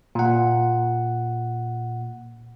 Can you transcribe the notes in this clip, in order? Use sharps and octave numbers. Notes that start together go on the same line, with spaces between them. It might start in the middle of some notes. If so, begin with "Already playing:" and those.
A#2 F#5